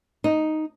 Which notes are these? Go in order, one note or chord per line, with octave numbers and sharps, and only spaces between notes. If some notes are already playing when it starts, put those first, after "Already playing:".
D#4